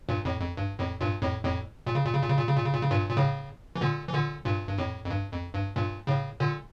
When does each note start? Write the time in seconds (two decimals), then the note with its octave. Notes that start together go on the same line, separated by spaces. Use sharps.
0.09 G2 A#2
0.25 F2 A2
0.41 F2
0.57 G2
0.79 F2 A2
1.01 G2 A#2
1.22 F2 A2
1.44 F2 A2
1.87 A#2
1.95 C#3
2.05 A#2
2.13 C#3
2.22 A#2
2.30 C#3
2.39 A#2
2.47 C#3
2.56 A#2
2.64 C#3
2.73 A#2
2.82 C#3
2.91 G2 A#2
3.09 A#2
3.17 A2 C#3
3.76 E3
3.81 A#2 D3
4.08 E3
4.13 A#2 D3
4.45 G2 A#2
4.68 G2
4.78 F2 A2
5.05 F2
5.10 G2
5.32 F2
5.54 G2
5.75 G2 A#2
6.07 A2 C#3
6.40 A#2 D3